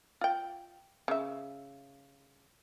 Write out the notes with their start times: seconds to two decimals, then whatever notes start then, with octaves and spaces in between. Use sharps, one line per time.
0.21 F4 G5
1.08 C#3 E5